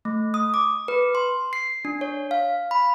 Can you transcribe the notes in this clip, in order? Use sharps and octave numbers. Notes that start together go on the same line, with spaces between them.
A3
D#6
D6
B4
C6
C7
D4
C#5
F5
B5